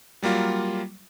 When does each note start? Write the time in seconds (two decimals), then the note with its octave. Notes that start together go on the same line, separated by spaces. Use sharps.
0.23 F#3 G3 A#3 F4